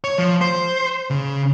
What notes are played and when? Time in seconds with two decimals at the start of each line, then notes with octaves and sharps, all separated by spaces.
0.04 C#5
0.18 F3
0.41 C5
1.10 C#3